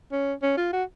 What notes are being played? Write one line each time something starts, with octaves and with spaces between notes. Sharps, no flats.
C#4
C#4
F4
F#4